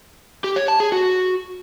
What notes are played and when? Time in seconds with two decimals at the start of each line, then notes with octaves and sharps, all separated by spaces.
0.44 G4
0.56 C#5
0.68 A5
0.80 G#4
0.92 F#4